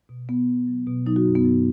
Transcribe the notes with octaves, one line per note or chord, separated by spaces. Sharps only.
B2
B2 B3
B2
F#3
B2
F#3 D#4
F#4
F#2
B3
F#2